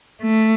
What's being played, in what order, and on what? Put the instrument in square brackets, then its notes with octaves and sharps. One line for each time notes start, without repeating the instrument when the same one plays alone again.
[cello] A3